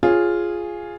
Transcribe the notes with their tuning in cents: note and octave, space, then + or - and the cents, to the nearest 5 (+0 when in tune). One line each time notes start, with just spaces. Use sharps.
F4 +0 G#4 +0 C#5 -10